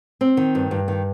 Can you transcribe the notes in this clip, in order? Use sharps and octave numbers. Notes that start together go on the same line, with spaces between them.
C4
D#3
G2
G2
D#3